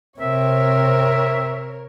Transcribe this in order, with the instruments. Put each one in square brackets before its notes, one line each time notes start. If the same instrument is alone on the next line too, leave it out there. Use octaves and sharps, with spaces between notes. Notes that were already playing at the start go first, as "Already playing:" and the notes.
[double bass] C3 C4 [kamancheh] A#4 C#5 [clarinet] E5